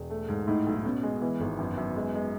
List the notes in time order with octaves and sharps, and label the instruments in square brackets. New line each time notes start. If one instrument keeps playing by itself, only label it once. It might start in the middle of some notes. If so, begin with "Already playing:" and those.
Already playing: [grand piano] E1
A3
G#2
[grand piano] A2 [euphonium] D#4
[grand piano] B1
[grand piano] B2 [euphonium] C#4
[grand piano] G#3
[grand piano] E3 [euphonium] B3
[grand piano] G#1
[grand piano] F#2 [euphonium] B3
[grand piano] F#2
G#3
G#3